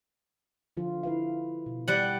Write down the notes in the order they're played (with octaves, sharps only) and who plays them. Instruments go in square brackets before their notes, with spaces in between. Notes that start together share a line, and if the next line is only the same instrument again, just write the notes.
[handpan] D3 F3 F4
E4 B4 F5
B2
[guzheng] G3 F#5